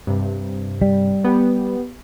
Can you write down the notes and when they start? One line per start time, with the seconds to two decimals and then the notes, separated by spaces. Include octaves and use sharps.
0.07 G2 C3
0.82 G3
1.24 B3 G4